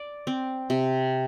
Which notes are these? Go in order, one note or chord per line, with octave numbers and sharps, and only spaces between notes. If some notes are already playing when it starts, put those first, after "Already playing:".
Already playing: D5
C4
C3